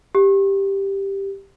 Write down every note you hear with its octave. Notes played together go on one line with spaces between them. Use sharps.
G4